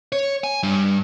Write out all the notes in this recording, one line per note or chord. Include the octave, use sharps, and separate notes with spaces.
C#5
G#5
G2